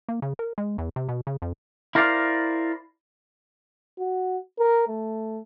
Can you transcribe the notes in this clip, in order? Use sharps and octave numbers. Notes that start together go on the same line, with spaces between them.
A#3
C#3
A#4
G#3
E2
C3
B2
C#3
F2
E4 A#4 C5 D5 F5
F#4
A#4
A3